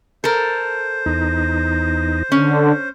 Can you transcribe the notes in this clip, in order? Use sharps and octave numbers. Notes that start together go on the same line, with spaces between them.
A4 A#4 C5
E2 D#4
D3 C#4